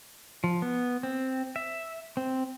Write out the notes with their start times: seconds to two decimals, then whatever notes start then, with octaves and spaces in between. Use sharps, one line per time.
0.44 F3
0.62 B3
1.03 C4
1.56 E5
2.17 C4